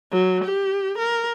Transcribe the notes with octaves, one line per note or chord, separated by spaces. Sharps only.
F#3
G4
A#4